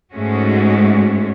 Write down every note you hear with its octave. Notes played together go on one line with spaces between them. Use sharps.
G#2 G#3 A3 C#4 F#4